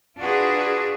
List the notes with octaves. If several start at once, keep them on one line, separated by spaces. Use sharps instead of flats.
D4 F4 F#4 G#4 B4